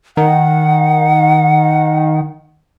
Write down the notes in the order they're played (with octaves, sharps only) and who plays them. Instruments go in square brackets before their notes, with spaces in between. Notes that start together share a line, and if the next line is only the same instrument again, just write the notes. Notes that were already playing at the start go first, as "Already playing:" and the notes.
[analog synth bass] D#3 [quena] F#5